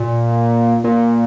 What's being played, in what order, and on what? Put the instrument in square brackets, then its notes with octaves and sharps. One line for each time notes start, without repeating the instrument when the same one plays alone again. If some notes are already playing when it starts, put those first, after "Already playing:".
Already playing: [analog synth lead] A#2
A#2